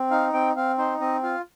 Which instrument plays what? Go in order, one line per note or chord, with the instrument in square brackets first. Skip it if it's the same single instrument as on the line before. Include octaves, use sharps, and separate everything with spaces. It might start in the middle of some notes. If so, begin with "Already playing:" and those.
Already playing: [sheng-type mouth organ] C4
D#4 F5
C4 G5
C4 F5
D#4 C5
C4 D#5
F4 F5